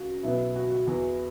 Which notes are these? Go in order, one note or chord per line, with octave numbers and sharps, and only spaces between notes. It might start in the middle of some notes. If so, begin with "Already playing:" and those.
Already playing: C#2 F#4
B1 B2 B3 E4
F#4
F#4
E2 E3 B3 F#4